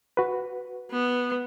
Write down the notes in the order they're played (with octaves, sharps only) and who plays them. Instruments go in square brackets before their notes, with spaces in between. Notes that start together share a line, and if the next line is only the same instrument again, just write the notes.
[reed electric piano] F#4 B4
[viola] B3